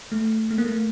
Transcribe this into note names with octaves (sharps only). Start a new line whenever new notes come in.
A3
A3
A#3
A3